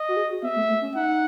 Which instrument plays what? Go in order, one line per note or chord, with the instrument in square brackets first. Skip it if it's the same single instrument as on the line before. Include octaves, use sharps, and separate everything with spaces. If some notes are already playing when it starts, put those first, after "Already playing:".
Already playing: [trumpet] D#5
[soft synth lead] F#4
G#4
F#4
[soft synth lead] B3 [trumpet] E5
[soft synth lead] A3
A3
C#4
[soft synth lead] D#4 [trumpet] F#5